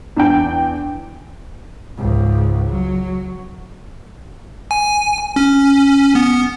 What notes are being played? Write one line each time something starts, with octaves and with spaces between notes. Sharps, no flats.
E2 D4 G5
C#2 G#2
F#3
G#5
C#4
B3